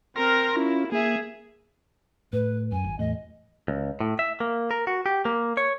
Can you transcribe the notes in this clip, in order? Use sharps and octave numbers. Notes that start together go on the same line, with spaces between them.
C4 A#4 C6 F6 A#6
C#4 E4 F4
A#3 G#4 E5
A2 B4
F#2 G#5
G#1
E2 A2 D#5
C#2
A2
E5
A#3
A#4
F#4
G4
A#3
C#5